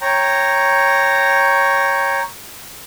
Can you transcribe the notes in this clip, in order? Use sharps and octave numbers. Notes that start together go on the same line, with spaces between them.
C#5 G5 A#5